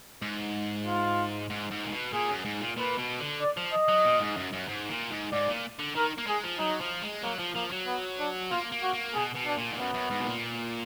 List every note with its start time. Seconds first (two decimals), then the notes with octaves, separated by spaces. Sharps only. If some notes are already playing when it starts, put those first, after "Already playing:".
0.22 G#2
0.86 F4
1.50 G#2
1.71 G#2
1.85 A#2
1.92 B2
2.13 A#2 G#4
2.29 F#2
2.45 G#2
2.61 A#2
2.76 A#2 B4
2.98 B2
3.20 D3
3.41 D5
3.57 F3
3.73 D#5
3.88 F#3
4.05 A#2
4.20 G#2
4.37 F#2
4.53 F#2
4.68 G#2
4.89 A#2
5.10 G#2
5.32 G#2 D5
5.48 A#2
5.79 D3
5.95 D#3 A#4
6.18 A#3
6.27 G#3 G#4
6.44 F3
6.59 F#3 D#4
6.80 F3
7.02 G#3
7.23 F#3 A#3
7.38 F3
7.55 F3 A#3
7.71 F#3
7.87 B3
8.19 D4
8.50 A#3 F4
8.72 A#3
8.82 F#4
8.94 A#3
9.14 B2 G#4
9.35 B2
9.46 D4
9.57 A#2
9.72 G#2
9.77 F#2 B3
9.94 F#2
10.10 G#2
10.20 B2
10.26 A#2